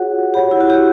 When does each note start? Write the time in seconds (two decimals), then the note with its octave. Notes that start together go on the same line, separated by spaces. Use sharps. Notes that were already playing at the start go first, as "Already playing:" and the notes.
Already playing: F4 F#4 G#4 C#5 F#5
0.34 G4 C#5 F#5 B5
0.51 E4
0.61 F#4
0.70 G4